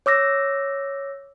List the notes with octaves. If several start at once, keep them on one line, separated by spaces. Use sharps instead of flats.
C#5 D6 E6 A#6